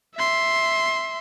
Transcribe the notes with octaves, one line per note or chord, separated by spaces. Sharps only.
E5 C6